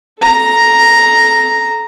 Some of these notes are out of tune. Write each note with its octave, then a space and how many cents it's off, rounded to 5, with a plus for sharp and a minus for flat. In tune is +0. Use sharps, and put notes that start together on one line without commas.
A4 -20 A#5 +0